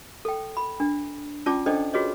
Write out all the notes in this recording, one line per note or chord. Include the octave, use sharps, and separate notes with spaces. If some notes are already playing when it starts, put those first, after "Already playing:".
A4 G5
B5
D4
C#4 F4 D5 G5 A5 D6
D4 A4 C5 D5 D#5 G5
F4 F#4 G#4 B4 C#5 D#5